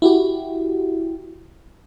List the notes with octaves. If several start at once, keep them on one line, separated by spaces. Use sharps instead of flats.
E4 F#4 G4